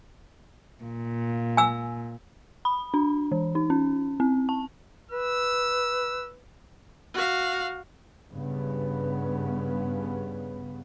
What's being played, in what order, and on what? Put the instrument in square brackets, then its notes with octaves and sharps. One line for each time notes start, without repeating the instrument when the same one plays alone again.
[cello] A#2
[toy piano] G#5 E6
[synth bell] B5
D4
E3
D#4
C#4
C4
A5
[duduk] B4 [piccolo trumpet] E6
[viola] F#4 F5
[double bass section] G2 C#3 B3